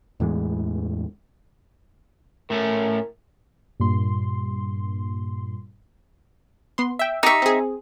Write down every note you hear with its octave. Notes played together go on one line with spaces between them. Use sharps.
E2 A2 E3 G#3
A2 A3 C#4 A#4
G2 A#2 C6
B3 C6
E5 G5
D#4 G4 E5 C#6
C4 G#4